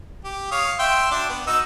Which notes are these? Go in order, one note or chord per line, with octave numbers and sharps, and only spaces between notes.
G4
C#5 F5 D#6
E5 G5 C6
D4 F#4 D5
B3
D#4 F#4 E6